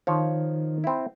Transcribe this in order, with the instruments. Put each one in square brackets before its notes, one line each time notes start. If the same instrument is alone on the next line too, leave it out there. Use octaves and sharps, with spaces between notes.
[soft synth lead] D#3 [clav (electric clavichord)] F3 C#5
[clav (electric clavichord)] C4 E4